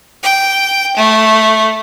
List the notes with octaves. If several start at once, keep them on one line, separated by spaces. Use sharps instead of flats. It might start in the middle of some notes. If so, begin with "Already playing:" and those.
G5
A3